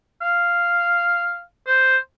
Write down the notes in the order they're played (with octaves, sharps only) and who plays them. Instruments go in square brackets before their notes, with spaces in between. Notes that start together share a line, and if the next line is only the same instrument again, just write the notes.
[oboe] F5
C5